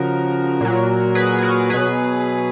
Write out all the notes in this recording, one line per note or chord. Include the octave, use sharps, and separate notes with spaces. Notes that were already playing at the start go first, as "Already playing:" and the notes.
Already playing: C#3 F3 F#4 A#4
A#2 F#3
G#4 B4
G#4
F#4 A#4
B2 F#3 G#4 B4